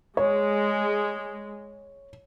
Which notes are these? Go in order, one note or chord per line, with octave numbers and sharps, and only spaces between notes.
G#3 C#5